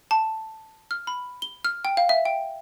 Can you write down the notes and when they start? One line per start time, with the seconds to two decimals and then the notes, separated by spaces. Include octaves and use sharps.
0.11 A5
0.91 F6
1.07 B5
1.42 G7
1.65 F6
1.85 G5
1.97 F5
2.09 E5
2.25 G5